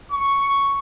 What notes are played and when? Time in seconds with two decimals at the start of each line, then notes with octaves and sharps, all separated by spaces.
0.12 C#6